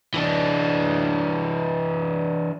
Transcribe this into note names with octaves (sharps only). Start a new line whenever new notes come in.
E3 D4